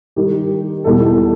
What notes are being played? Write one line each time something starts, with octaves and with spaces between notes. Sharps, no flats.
D#3 G3 D#4 G4
E2 B2 G3 D#4 A4